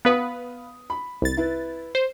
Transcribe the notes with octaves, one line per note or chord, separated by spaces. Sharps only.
B3 B4 F5 B5 D#6
B5
C2 A6
E4 B4
C5